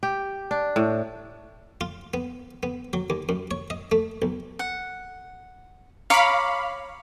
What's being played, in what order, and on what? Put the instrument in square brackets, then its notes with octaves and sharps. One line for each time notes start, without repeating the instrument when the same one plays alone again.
[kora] G4
D4
A2
[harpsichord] F4
B3
B3
F#3
D#2
F#2
C#5
D#5
A3
B1
[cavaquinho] F#5
[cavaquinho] C#5 A#5 D6 [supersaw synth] F5 B5